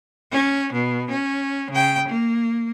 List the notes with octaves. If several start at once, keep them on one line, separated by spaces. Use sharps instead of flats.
C#4
B2
C#4
C#3 G5
A#3